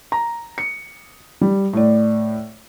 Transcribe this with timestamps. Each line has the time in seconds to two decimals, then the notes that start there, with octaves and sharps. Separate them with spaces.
0.12 A#5
0.58 C#7
1.41 G3
1.73 A2 D5